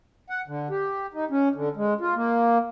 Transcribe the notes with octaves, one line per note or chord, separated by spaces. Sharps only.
F#5
D3
G4
D#4
C#4
D3
G#3
F4
A#3